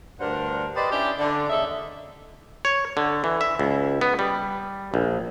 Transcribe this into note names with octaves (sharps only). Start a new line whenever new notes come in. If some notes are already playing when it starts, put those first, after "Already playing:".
D2 G2 D4 A#4 C5 F#5
G4 B4 C5 D5 D#5
C#4 D4 E4 G4
D3 D4
D#2 C#3 D#4 A4 E5
C#5
D3
E3
E5
C#2
B3
G3
A#1